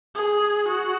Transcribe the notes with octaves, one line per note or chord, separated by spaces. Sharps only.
G#4
F#4